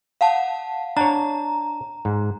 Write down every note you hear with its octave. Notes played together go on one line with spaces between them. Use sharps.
F5 F#5 A5
D4 C#5 A#5
G#2